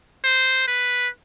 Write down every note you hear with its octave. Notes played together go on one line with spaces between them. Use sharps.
C5
B4